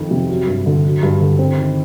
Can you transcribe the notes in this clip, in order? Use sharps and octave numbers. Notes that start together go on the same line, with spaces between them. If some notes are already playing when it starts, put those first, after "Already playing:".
Already playing: F2 D#3
C3
F#3
G2
D3
F#3
G2
D3
C4
D#3